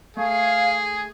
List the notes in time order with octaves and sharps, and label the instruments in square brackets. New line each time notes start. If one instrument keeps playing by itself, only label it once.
[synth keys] A3 [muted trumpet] G#4 [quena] F5